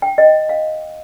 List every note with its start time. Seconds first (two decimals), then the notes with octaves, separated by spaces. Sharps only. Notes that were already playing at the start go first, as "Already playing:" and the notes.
0.02 G5
0.18 D#5
0.49 F5